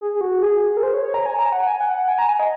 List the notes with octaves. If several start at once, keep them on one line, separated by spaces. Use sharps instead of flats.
G#4
G#4
F#4
G#4
A#4
C5
C#5
C#5
A#5
G#5
A#5
F#5
G#5
F#5
F#5
G#5
A#5
G#5
D#5